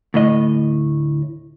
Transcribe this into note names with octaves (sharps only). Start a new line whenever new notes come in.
D2 A2 D#5